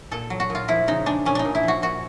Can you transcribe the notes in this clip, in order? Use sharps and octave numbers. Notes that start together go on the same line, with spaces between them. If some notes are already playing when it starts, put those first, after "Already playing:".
A#2 A4
F#3
F#4
A#2
F4
F3 E4
C#3 D#4
G#3 D4
A#2 C#4
D4 D#4
A#2
E4
F3 F#4
A#2 F#4